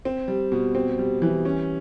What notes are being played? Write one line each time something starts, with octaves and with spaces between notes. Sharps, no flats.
C4
G3
B2
C4
G3
E3
C#4